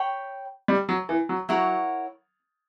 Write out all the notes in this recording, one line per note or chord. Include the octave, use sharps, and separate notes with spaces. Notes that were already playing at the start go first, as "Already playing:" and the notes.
Already playing: C#5 G5 B5
G3
F#3
E3
F#3
F#3 E4 A#4 C#5 F#5